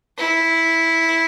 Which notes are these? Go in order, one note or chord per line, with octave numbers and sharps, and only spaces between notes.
E4